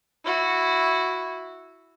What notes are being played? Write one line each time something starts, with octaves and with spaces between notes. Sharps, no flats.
E4 F#4